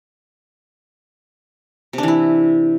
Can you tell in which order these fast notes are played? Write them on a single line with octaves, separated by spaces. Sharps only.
C3 D4 E3 E4